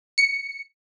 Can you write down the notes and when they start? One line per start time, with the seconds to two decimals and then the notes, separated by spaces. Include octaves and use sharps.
0.18 C#7